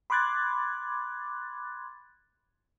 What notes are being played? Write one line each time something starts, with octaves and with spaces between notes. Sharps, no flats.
B5 C6 D6 F#6 G#6 A6